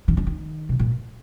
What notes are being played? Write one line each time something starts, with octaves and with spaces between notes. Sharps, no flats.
D#3
D3
D#3
B2
A#2